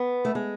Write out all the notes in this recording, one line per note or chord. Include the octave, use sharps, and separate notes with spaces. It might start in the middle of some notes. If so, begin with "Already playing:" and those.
Already playing: B3
A3
G#3